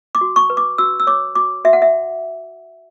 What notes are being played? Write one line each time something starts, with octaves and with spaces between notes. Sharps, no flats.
D6
F#4
C#6
B4
D6
F#4 E6
E6
C#5 D6
F#4 D6
F#4 E5
F#5
E5